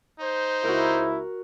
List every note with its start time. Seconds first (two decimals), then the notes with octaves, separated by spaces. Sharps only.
0.19 D#4 C5
0.64 C#2 E4 F#4 A#4